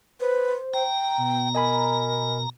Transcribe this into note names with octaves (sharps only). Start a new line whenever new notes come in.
B4 C5
G5 A#5
B2
A#4 D#5 G#5 B5